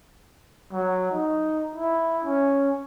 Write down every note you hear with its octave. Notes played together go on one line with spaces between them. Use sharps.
F#3
D#4
E4
C#4